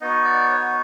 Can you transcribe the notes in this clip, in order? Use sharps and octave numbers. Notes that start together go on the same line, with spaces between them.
B3 D#4 F#4 D#5
D5
C#5